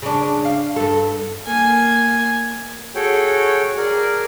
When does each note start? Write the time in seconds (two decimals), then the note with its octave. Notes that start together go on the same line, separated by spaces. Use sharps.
0.02 C#3 D4
0.45 F5
0.76 G2 A4
1.45 A#3 G#5
2.95 F#4 G#4 A4 C#5 G5
3.78 G#4 A#4 D5